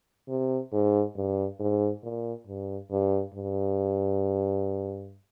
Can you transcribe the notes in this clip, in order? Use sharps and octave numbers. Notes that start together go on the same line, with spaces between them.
C3
G#2
G2
G#2
A#2
G2
G2
G2